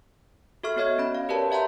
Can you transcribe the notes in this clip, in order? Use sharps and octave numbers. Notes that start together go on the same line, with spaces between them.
F#4 A4 E5 C#6 F6
B3 F#4 C#5 D#5 E5 G#6
C#4 B5
F5
G4 A#4 B4 C#5 D5 A5
G4 E5 F#5 A#5 C6 G6